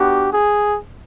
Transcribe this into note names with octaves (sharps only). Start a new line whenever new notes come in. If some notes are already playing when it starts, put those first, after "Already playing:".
Already playing: B3 D4 F#4 G4
G#4